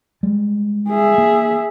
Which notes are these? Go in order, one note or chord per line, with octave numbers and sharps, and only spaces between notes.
G3 G#3
G#4 E5
A#3